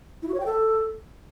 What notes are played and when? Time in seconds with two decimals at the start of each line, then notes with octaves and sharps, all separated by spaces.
0.22 E4
0.28 F#4
0.34 C#5
0.40 G5
0.46 A4